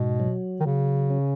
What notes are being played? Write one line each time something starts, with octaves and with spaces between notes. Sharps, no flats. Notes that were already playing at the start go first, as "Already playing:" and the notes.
Already playing: G#2 B2
F#3
D#3
C#3 F#3
C#4